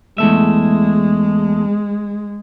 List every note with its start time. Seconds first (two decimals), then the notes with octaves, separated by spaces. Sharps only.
0.18 E2 G#3 A3 E5